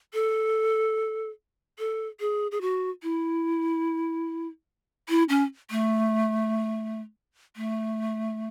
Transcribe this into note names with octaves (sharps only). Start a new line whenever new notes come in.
A4
A4
G#4
G#4
F#4
E4
E4
C#4
A3
A3